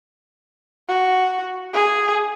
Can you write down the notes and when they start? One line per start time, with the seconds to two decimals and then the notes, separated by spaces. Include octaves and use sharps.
0.89 F#4
1.73 G#4